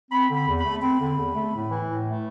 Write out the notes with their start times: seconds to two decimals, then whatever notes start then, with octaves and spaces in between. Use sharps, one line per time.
0.11 C4 B5
0.29 D3
0.36 B5
0.47 E2
0.59 B5
0.64 A3
0.82 C4 B5
1.00 D3
1.18 E2
1.35 A3
1.53 A2
1.71 E3
1.88 A2
2.06 A3